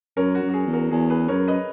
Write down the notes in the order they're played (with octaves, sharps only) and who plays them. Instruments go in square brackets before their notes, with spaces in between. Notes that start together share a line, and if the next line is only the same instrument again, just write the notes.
[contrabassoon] F#2 [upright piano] A#4 C#5
[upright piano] F#4
[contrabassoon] F#2
[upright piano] F#4
G#4
[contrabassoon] E2
[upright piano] F#4 A#4
[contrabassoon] E2 [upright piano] G#4
[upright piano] G#4 B4
[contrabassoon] F#2 [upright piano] A#4 C#5
[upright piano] B4 D#5